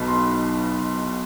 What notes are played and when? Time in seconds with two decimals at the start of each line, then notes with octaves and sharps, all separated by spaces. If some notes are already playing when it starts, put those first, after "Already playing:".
Already playing: B1 B2 B5
0.08 C6